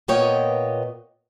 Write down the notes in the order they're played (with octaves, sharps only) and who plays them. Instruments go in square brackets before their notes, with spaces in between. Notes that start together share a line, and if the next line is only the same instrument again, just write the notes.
[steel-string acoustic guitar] A#2 A#3 B3 C#5 D#5 G5